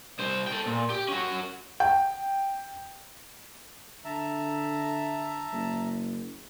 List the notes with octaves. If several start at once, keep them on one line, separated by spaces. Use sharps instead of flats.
C2 C5
A4 G5
A#2
G4
C#4 F#4
G5
D3 E5 A5 A#5
F#1